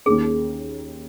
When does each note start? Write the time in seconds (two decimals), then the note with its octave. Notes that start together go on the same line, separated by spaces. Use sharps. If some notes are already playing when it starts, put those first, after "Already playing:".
0.06 D#2 D#3 A#3 C#4 G#4